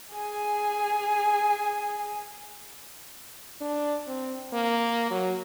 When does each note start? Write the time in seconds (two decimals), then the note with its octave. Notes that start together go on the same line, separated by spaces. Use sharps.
0.14 G#4 G#5
3.61 D4
4.07 C4
4.53 A#3
5.10 F#3